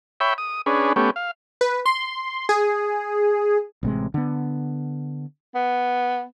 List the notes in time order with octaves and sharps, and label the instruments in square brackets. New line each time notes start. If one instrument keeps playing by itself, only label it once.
[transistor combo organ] C#5 E5 G5 B5
D#6
C#4 D4 G#4 B4
A3 B3 C#4 G4
F5
[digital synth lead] B4
C6
G#4
[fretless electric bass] A1 C3 G#3
D3 B3
[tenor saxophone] B3